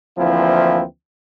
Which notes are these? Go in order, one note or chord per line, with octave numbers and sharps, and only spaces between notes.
D2 E3 F3 A#3 C4 E4